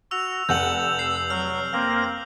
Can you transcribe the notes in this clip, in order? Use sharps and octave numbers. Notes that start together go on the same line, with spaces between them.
F#4 E6 F7
F1 F#5 E6 G6 F7 F#7
C7
F#3 F6
A#3 C4 A#6